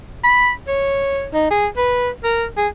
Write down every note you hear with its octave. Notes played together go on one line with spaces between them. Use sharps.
B5
C#5
D#4
G#4
B4
A#4
G#4